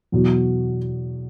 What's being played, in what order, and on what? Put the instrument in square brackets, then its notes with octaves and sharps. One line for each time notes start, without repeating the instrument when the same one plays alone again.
[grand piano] E2 B2 F#3